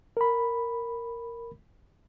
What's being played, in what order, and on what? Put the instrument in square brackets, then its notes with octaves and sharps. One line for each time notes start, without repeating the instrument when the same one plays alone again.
[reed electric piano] A#4 B5